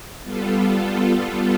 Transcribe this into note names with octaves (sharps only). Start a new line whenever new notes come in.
G3 B3 F4 A4